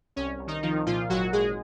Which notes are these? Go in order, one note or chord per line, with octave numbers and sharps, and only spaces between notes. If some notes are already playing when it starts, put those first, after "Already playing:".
C2 C#4
C2
D#3 D#4
D#3 F3 D#4
A#2 F3 F4
G#1 F#3 F#4
G#1 G#3 G#4